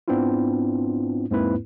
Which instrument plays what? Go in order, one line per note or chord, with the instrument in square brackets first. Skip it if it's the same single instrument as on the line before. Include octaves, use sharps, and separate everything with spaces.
[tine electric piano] G#2 B3 C4 D4 E4 F4
E2 G#2 A#3 C4 E4 B4